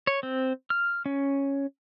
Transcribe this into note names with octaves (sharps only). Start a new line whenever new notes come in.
C#5
C4
F6
C#4